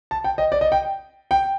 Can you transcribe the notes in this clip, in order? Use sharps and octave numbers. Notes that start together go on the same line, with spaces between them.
A5
G5
D#5
D5
D#5
G5
G5